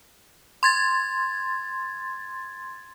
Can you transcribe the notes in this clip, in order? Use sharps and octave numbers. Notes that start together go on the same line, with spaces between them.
C6 G#6 A6